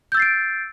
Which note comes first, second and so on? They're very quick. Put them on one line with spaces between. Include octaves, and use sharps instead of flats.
G6 E6 A6 C7 D7